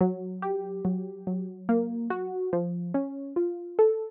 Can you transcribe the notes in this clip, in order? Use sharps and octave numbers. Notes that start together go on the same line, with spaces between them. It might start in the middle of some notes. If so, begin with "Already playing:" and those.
F#3
G4
F#3
F#3
A#3
F#4
F3
C#4
F4
A4